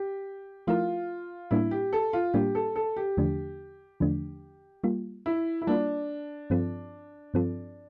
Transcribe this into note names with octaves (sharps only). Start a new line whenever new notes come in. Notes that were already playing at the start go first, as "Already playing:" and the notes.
Already playing: G4
F3 A3 E4 F4 A#4
A2 G3 A#3 D4 E4
G4
A4
F4
A2 G3 A#3 D4 G4
A4
A4
G4
E2 D3 F3 A3 D4
E2 D3 F3 A3 D4
G3 A#3 F4
E4
E4
G3 A#3 D4 F4
G2 F3 C4 F4 A4
G2 F3 C4 F4 A4